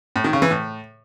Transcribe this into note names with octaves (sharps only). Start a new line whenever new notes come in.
A2
D#3
C#3
E3
A2